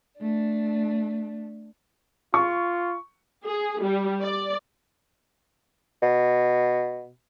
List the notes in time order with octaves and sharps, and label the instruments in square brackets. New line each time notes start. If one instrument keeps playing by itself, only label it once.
[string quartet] A3 D4
[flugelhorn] F4 [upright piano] C#6
[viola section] G#4
G3
D5
[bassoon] B2